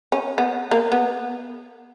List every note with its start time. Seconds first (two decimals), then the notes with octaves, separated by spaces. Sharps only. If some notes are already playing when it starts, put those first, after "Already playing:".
0.12 C#4
0.38 B3
0.71 A#3
0.92 B3